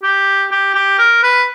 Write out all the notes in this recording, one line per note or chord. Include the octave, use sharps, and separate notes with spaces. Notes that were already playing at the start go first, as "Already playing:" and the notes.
G4
G4
G4
A#4
B4